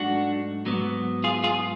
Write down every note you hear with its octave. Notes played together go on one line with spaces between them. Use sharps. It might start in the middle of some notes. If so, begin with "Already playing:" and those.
Already playing: G#2 F#3 A3 D4 F#4
G#2 F#3 B3
F4 G#4
F4 G#4